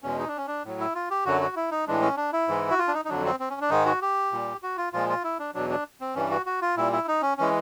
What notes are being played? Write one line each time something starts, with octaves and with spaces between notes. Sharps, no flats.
E2 B2 G#3 C#4
D#4
D4
C#4
D4
A2 F#3
E4
F4
G4
F#2 D3 F#3 F#4
F#4
E4
D#4
A2 E3 G#3 D4
C#4
D4
E4
G#2 E3 G#3
F#4
F4
D4
D#4
D#4
F2 D3 F#3 D4
C4
C4
C#4
D4
G#2 D#3 G#3 D#4
F#4
G4
A#2 G3
F#4
F4
A#2 F3 G#3 F4
F4
E4
D4
E2 B2 F#3 D4
D4
C4
G2 E3 G3 C#4
F#4
F#4
F4
A#2 G3 E4
E4
D#4
C#4
E3 G#3 C#4